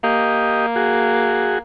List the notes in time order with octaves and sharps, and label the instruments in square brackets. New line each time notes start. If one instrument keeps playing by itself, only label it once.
[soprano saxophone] A#3 [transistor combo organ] G4 D#5
[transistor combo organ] F#4 G#4